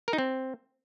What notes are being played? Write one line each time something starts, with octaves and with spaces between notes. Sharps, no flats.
A#4
D#4
C4